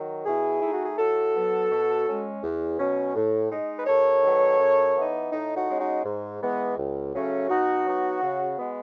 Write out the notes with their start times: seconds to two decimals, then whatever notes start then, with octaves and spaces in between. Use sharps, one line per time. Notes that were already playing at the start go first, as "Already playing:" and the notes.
Already playing: D#3 F#3
0.25 B2 E4 G#4
0.60 A3 D#4 E4
0.72 F#4
0.85 G#4
0.98 A2 F#4 A4
1.34 F#3 B3
1.70 B2
2.06 G#3 C#4
2.42 E2
2.79 B2 F#3 C#4
3.15 A2
3.51 G#3 D#4
3.77 B4
3.87 D#2 A4 C#5
4.23 D#3 F#3 B3
4.59 F#2
4.96 E3 B3 D#4
5.32 A2 D#4
5.56 D#4 F#4
5.68 G#3 C#4
5.80 D#4 F#4
6.04 G#2
6.40 E3 G#3 B3
6.76 C#2
7.13 C#3 F#3 A3 C#4
7.49 B2 D#4 F#4
7.84 F#3 B3 D#4
8.21 C#3
8.58 G#3 B3